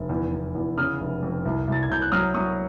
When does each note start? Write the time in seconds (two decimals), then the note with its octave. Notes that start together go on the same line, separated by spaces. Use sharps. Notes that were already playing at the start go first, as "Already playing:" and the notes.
Already playing: F1
0.09 E2
0.32 E2
0.55 E2
0.78 C#3 D#6 F6
1.00 F1
1.23 F2
1.45 C2
1.68 C2 A6
1.83 G#6
1.89 C2 G6
2.02 F#6
2.12 F#3 D#6 F6
2.34 F#3 C#6 D#6